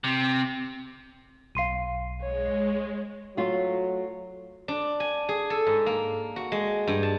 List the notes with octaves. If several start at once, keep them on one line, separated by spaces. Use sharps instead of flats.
C3
B1 F5 C6 C7 D#7
G#3 C#5
F#3 A3 F4
D4
G#5
G#4
A4
G#2
A#3
F#4
G#3
G2
A5